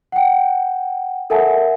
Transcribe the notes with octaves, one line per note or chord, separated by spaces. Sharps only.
F#5 G5
A4 A#4 E5 F#5 G#5 A5